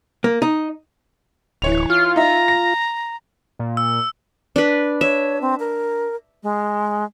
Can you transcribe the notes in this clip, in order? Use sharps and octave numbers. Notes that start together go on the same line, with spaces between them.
A#3
D#4
D1 E3 C#5 F7
F4 F6
D#4 E5 A#5
A#6
A#2
E6
D4 B4
C#5 E5
C4
A#4
G#3